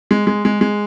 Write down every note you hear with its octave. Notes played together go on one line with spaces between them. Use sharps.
G#3
G#3
G#3
G#3